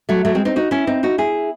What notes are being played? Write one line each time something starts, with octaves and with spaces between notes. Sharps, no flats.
F#3 A3
F#3 A3
G#3 C4
C4 D#4
D#4 F#4
C#4 E4
C4 D#4
D#4 F#4
E4 G#4